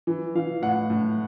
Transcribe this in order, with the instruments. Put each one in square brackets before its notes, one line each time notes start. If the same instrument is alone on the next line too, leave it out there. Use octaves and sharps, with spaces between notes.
[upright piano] E3
E3 F5
A2 F#5
A2